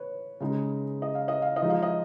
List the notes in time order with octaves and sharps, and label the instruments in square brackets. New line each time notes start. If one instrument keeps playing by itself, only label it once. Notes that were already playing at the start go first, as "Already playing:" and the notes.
Already playing: [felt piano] B4 C#5
C#3 G#3 D#4
D#5
F5
D#5
F5
D#5
F3 G#3 D#4
F5
D#5